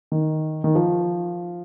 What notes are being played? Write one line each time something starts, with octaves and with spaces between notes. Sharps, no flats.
D#3
D#3
F3